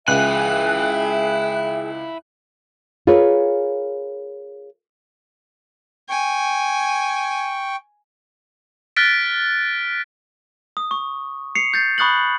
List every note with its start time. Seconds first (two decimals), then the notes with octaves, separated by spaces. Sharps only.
0.08 C#2 E4 G#4 E5 G5 G#5 F#6
3.07 F4 G#4 A#4 B4 C#5
6.09 G5 G#5 C#6
8.96 F6 F#6 A6 B6 D7
10.77 D#6
10.91 C#6
11.55 C7 C#7 F7
11.74 G6 A6 C7
11.98 B5 C#6 D#6 F#6 A6 F#7